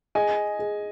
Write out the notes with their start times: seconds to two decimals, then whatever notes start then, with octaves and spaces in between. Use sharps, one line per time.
0.15 G#4 D#5 G#5
0.59 G#4